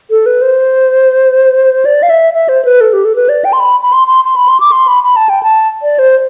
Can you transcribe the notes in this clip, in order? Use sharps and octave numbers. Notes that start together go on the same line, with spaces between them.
A4
B4
C5
D5
F5
E5
E5
C5
B4
A4
G4
A4
B4
D5
G5
C6
B5
B5
C6
C6
C6
B5
C6
D6
C6
B5
B5
A5
G5
A5
D5
C5